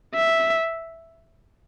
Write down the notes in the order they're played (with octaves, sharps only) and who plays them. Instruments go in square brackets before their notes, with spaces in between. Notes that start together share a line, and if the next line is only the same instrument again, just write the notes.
[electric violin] E5